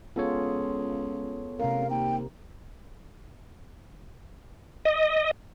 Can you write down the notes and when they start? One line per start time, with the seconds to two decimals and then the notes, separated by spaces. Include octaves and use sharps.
0.16 C#2 B3 F4 G#4 A4 C#5
1.60 A1 C3 A#4 F5
1.90 D#2 G5
4.85 D#5